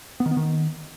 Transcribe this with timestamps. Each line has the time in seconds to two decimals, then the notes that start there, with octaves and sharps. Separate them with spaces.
0.20 B3
0.26 D#3
0.31 B3
0.37 D#3